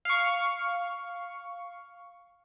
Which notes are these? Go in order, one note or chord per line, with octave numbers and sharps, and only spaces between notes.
F5 C#6